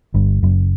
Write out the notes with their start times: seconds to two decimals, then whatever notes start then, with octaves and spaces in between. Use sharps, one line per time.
0.14 G1 G2
0.43 F#1 F#2